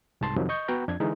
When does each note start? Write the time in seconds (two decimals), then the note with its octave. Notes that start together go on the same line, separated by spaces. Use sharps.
0.21 C2 G#2 A5 C6
0.36 F2 C3 D#3 F3 F#3
0.49 D#5 C#6 G6
0.68 B3 F#4 G5 A#5
0.87 F2 D4 G#6
1.00 D3 E3 G#3 D#4